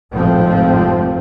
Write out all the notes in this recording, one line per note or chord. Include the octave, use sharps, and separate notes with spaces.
G#1 F2 A2 C3 F3 C4